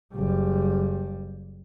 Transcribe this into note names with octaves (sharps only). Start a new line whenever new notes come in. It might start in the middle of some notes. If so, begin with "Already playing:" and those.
F#1 G3